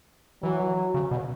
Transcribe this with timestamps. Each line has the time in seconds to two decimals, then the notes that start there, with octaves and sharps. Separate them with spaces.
0.43 E3 F#3
0.94 C#3
1.11 B2